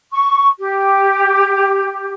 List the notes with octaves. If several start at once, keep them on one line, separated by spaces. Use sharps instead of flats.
C#6
G4